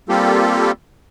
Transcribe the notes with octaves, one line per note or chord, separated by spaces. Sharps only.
G3 A#3 C4 F4 G4 A4